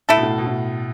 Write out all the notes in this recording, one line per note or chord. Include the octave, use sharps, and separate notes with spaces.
A2 A3 E4 A4
B2
A2
B2
A2